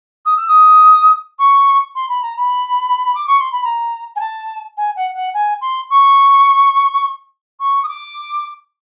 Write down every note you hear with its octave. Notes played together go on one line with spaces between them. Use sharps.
D#6
E6
D#6
C#6
C6
B5
A#5
B5
D6
C#6
C6
B5
A#5
G#5
A5
G#5
F#5
F#5
G#5
C6
C#6
C#6
D#6
D6